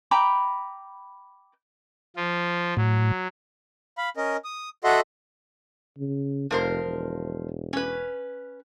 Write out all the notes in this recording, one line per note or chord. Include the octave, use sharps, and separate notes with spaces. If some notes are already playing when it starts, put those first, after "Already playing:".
G5 A#5 B5 D6
F3 F4
A2 F#3
F5 B5
C#4 A#4 D#5
D#6
F#4 A4 D#5 E5 F#5 C6
C#3
F1 F3 A#4 C5
E1
C#4 B4